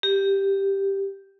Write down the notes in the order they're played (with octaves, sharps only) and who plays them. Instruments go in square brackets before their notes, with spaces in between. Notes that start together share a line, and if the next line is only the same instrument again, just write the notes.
[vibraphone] G4